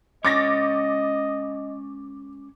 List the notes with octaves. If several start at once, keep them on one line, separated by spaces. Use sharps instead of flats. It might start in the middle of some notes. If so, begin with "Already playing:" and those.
G#3 C#4 C#5 D#5 D6 A6 A#6